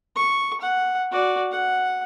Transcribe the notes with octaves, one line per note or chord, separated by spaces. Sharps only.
C#6
F#5
F#4 D5
F#5